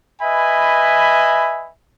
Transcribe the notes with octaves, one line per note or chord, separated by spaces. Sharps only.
B4 D#5 E5 G#5 B5